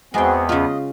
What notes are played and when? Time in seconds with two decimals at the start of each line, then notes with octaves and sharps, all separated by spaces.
0.14 E2 G#3 B3 C4 F#4 G#4 G5
0.49 C#3 F4 D#5